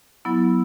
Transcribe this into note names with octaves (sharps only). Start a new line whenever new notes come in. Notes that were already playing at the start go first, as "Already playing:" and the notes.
F#3 B3 E4